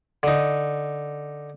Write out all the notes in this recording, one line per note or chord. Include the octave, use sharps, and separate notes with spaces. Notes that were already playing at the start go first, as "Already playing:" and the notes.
D3 D#4